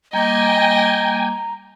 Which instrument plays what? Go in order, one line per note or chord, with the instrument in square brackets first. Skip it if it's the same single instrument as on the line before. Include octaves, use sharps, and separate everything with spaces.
[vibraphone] G3 A#3 D6 [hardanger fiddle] D#5 [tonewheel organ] G5 G#5 [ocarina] A#5